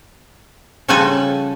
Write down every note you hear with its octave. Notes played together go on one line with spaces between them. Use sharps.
C#3 F3 G3 F#4 A4 G#5